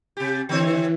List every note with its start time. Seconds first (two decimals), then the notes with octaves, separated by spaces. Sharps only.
0.17 C3 G4
0.49 D3 E3 C4 C#5